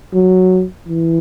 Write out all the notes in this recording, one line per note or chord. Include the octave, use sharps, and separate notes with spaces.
F#3
E3